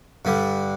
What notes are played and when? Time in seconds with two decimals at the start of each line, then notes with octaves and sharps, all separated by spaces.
0.25 G2 D3 G3